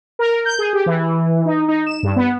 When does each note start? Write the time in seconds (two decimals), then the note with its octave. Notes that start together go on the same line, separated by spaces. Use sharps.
0.19 A#4
0.45 G6
0.59 G#4
0.73 G4
0.86 E3
1.45 D#4
1.68 D#4
1.87 E7
2.03 G2
2.16 B3